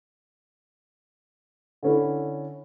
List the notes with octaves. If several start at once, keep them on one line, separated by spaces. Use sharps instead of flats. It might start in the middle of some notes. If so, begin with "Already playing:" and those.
D3 C#4 E4